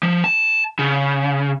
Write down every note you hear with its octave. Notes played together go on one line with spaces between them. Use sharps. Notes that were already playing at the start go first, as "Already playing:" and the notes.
F3
A5
C#3